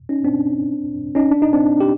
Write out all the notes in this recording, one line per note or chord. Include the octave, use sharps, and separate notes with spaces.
C#4 D#4
C4 D4
C#4 D#4
D4
D#4
C4 D4
G4